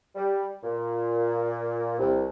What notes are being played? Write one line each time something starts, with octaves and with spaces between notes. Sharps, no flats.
G3
A#2
C2